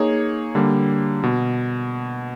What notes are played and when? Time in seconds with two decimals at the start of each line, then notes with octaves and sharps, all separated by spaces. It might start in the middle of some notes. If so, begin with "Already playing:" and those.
Already playing: A#3 D#4 G#4 C#5
0.55 D3 G3 A#3
1.23 B2